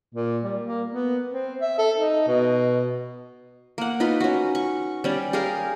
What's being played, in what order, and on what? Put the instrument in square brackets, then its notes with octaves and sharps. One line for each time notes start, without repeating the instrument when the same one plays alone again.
[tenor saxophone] A#2
G3
A#3
B3
C4
E5
A4
D#4
B2
[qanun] A#3 F#5
D#4 F4 B4
C#4 F#4
C#6
G3 C#4 D5
G4 G#4 A#4 F5